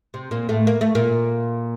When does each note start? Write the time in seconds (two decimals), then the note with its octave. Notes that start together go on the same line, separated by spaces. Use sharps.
0.14 C3
0.31 A#2 A#3
0.49 A2 A3
0.67 A#3
0.81 A3
0.95 A#2 A#3